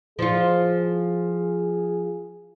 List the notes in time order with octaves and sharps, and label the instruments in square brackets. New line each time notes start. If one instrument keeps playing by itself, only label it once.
[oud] F3 F4 [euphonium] G#4